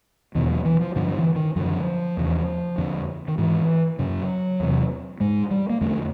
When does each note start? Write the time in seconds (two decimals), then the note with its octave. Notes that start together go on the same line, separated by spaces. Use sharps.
0.35 E2 B2 D#3
0.50 F#3
0.65 E3
0.80 F3
0.96 G2 D3 F3
1.16 E3
1.36 D#3
1.56 F#2 D3 F3
2.17 E2 C#3
2.78 F2 D3
3.28 D#3
3.38 G#2 E3
3.99 F#2 C#3 F#3
4.60 E2 C3
5.20 G#2 G#3
5.51 G3
5.70 A#3
5.81 F2 D3 A3